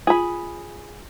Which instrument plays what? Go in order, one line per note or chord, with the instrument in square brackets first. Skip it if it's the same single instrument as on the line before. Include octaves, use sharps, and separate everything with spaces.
[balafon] F4 [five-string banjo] G#4 B5